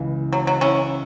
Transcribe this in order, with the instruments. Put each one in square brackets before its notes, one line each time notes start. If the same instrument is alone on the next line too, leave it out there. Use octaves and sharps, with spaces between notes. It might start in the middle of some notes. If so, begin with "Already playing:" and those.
Already playing: [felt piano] C#2 C#3 E3
[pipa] F#3
F#3
C#4 E4